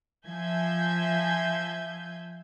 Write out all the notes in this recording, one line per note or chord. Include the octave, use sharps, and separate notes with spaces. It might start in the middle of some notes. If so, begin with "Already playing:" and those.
F3 E5 G#5 G6 G#6